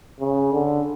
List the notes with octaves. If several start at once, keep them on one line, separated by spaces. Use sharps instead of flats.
C#3
D3